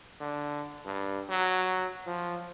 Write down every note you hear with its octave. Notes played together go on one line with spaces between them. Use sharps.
D3
G2
F#3
F3